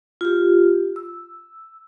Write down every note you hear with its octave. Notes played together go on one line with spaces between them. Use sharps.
F4 G4
E6